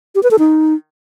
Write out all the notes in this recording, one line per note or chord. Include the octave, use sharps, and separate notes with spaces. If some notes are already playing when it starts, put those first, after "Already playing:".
G4
B4
A4
D#4